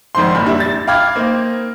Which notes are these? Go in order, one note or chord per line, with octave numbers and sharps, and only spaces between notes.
G#1 F2 D#3 C5 C6
F#1 B5
G3 D4 E4
A6
F5 G5 B5 D6 F6 G#6
A#3 C4 D#4